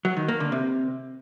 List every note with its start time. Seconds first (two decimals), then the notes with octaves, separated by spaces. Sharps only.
0.05 F#3
0.17 D#3
0.28 A#3
0.40 D3
0.52 C3